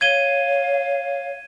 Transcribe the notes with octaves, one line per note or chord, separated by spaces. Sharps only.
C#5 F5 G#6 D#7 G7